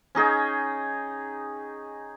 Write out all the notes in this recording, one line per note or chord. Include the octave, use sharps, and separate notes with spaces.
C#4 D#4 G#4 G5